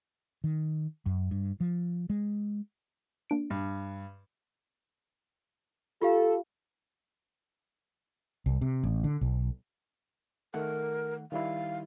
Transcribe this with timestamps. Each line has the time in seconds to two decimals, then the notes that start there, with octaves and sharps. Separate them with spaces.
0.44 D#3
1.06 F#2
1.31 G2
1.60 F3
2.10 G#3
3.30 A#3 D4 D7
3.50 G2
6.02 F4 G4 A4 F5
8.46 C2
8.61 C3
8.83 A1
9.04 D3
9.21 B1
10.54 D#3 A3 A#4 F#5
11.32 D#3 G3 E4 F5